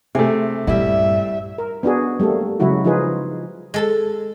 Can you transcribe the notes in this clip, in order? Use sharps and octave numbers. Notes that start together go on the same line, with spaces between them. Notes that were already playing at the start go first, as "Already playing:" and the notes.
C3 A3 G#4
G2 A#2 G3 E4 E5
A#4
B3 D4 F#4 G#4
G3 A3 A#3 A4
C#3 F#3 G#3 E4 F#4
F3 D#4 F4 G#4 B4
G#3 A4 A5